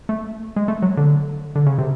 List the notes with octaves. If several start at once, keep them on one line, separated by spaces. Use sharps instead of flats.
A3
G#3
A3
F#3
D3
D3
C#3
C3